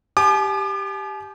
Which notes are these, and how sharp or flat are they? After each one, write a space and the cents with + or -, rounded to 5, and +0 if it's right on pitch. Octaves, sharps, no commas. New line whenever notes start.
G4 +0 G#5 +45 D6 +35